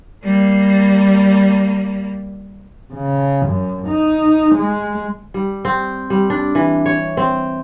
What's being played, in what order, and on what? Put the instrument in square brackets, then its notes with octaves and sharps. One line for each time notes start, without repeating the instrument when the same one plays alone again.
[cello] G3 A#3
[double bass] C#3
F#2
D#4
G#3
[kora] G3
C4
G3
D4
E3
C#5
C4